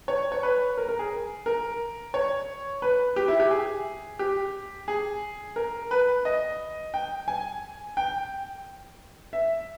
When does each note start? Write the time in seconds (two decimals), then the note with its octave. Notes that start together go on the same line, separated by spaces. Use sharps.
0.08 C#5
0.32 C#5
0.43 B4
0.77 A#4
0.89 A#4
0.99 G#4
1.46 A#4
2.14 C#5
2.82 B4
3.16 G4
3.28 E4
3.40 G4
3.51 G#4
4.19 G4
4.88 G#4
5.56 A#4
5.91 B4
6.25 D#5
6.94 G5
7.28 G#5
7.97 G5
9.33 E5